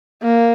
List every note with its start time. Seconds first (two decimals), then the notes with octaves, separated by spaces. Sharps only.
0.23 A#3